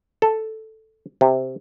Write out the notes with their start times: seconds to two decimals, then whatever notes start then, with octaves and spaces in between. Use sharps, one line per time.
0.22 A4
1.21 C3